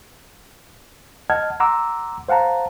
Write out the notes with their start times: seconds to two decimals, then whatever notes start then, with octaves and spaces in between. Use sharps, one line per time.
1.30 D#5 F#5 A5 F6 G#6
1.60 F#5 A#5 C6 D6 E6
2.29 C5 F5 F#5 A5 A#5